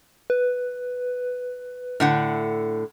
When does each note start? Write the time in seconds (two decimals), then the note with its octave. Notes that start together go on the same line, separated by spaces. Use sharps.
0.30 B4
2.00 A2 D3 F#5